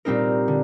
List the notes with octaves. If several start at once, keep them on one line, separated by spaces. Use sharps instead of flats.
A#2 G3 C4 D#4 A#4
D3